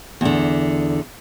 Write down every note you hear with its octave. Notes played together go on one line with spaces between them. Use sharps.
E2 D3